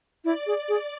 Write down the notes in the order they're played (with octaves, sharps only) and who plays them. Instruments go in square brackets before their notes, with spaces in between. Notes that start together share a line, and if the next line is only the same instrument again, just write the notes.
[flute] E4 [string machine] D5
[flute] G#4
G#4